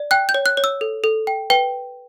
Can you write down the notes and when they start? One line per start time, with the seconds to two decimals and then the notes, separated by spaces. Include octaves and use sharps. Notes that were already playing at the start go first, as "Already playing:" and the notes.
Already playing: D5
0.11 G5 F#6
0.29 G6
0.34 C#5
0.46 F#6
0.57 C#5
0.64 E6
0.81 A4
1.04 A4
1.27 G5
1.50 B4 G5